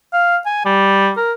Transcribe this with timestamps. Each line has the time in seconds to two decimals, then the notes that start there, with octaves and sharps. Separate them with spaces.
0.13 F5
0.46 G#5
0.65 G3
1.17 A#4